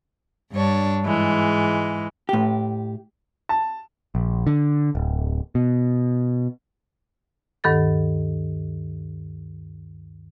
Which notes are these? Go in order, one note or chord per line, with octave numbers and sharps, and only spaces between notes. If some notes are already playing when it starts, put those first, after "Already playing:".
G2 D4 C#5
G#2 E3 G#3
A2 G4
A5
A#1
D3
D1
B2
D2 G2 D#3 A4 A6